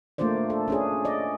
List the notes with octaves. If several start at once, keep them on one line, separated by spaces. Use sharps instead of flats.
A3 A#3 D4 F4 C5 D5
A4
C#4 D4 G#4
D5 D#5